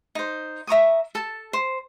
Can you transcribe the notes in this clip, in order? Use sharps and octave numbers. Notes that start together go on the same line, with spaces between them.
D#4 C5
E5 A#5 C#6 D#6
A4 A5
C5